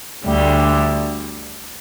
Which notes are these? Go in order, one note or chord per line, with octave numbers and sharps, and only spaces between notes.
D2 D3 G3